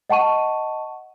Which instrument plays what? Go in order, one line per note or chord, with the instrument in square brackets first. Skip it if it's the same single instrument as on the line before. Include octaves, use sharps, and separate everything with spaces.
[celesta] D#5 F#5 A5 C#6 D#7